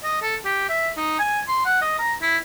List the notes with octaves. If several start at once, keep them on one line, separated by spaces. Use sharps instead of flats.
D#5
A4
G4
E5
D#4
G#5
C6
F#5
D#5
A#5
E4